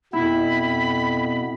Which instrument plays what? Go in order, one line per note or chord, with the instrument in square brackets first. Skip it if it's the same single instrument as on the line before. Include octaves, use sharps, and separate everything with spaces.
[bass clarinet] F2 [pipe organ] B2 B3 [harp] E4 [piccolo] B5